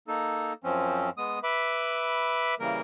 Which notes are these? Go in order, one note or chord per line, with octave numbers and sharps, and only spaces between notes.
A#3 D#4 A4
F#2 F3 C4 C#4
G#3 B3 D#6
B4 E5 B5 D6
C#3 E3 G3 A#3 A#4